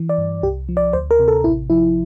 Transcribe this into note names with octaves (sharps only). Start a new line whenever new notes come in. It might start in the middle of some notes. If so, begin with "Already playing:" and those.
Already playing: E3
D5
G2
C2 G4
F3
D5
D2 C5
A#4
C3
A4
A1 E4
F3 E4